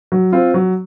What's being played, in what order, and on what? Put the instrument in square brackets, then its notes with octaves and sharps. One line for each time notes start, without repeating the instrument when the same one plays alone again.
[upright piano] F#3
C4 F4
F#3